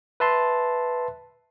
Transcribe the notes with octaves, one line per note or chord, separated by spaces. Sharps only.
B4 E5 A5 C6